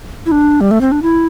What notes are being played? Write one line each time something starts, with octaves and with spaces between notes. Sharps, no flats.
E4
D4
G3
A3
C4
D4
E4